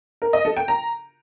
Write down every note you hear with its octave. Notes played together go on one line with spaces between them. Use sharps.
A#4
D#5
A4
G5
A#5